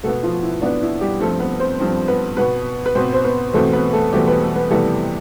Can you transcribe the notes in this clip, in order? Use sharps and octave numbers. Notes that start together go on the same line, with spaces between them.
B2 A3 B3 A4
F3 F4
E4
B2 B3 D4
E4
G3 G4
G2 F3 A3 C4 A4
B3 B4
C4 C5
G2 F3 C4
B3 B4
B2 B3 B4
B4
B2 B3 C4 C5
C5
B3 B4
E2 B2 A3 C4 A4
B3 B4
A3 A4
E2 B2 G3 A3 C4 G4
B3 B4
A3 A4
B3 B4
F2 C3 E3 G3 A3 B3 A4